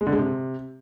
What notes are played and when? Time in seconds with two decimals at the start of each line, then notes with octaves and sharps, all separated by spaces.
0.01 G#3
0.07 D3
0.12 G#3
0.18 C3